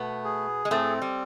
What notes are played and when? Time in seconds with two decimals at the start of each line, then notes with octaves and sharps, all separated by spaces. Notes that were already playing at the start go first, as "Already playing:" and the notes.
Already playing: B2 A3 B3
0.24 G#4
0.65 G#3
0.71 A2 A3 C4
1.02 G3